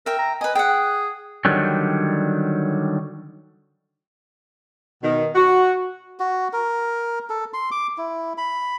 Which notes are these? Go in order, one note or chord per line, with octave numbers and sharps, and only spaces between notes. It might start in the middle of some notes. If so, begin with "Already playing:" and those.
A#4 E5 G5
A#5
B4 D#5 G#5
G#4 F#5 G5
D3 D#3 F#3 G3
B2 D#3
F#4
F#4
A#4
A4
C6
D6
E4
B5